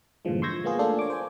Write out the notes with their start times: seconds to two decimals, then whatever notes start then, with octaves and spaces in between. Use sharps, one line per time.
0.25 G2 A#2 D3 E3 F3 G#3
0.42 C6 C#6 E6 G6 G#6 A#6
0.64 G#3 A#3 B3 F4 G#4
0.79 A3 A#3 D4 F4 A4 D5
0.99 C#5 D6
1.10 C5 G#5